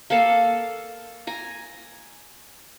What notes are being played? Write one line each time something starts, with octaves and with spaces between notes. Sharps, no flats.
A#3 A4 F5 A5
G#5 A#5